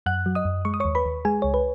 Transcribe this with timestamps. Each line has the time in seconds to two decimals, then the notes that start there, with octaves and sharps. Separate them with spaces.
0.06 F#2 F#5 F#6
0.26 F#3
0.35 D#5 D#6
0.45 F#2
0.65 G#3 C#6
0.74 D#6
0.80 D#2 C#5 C#6
0.95 B4 B5
1.06 D#2
1.25 G#3 G#4 G#5
1.42 C#2 C#5
1.54 B4